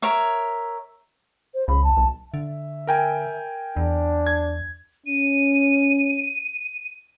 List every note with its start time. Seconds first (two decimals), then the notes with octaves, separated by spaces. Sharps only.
0.02 A#4 C#5 E5
1.54 C5
1.68 C#2 B5
1.84 A5
1.97 B1
2.34 D3 E5
2.87 A#4 G5 G#5
3.76 E2 D4
4.27 G#6
5.06 C#4 D#7